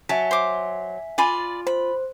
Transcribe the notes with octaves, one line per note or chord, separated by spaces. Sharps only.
F#3 E5 G#5 A5 B6
C5 D6
F4 D5 G#5 B5
C5 B5